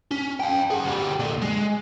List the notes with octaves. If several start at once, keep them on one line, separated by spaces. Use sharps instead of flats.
C#4
F5 G5
G#4 F#5
D2 G3
A#2 D3
G#3